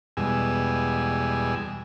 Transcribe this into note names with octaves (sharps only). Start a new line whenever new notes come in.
E2 B2 G3 G#3 G#5 E6